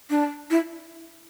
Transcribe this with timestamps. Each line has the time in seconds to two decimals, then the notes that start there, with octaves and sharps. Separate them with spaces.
0.10 D4
0.50 E4